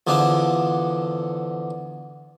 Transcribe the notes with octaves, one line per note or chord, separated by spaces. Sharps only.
E2 D3 F3 D4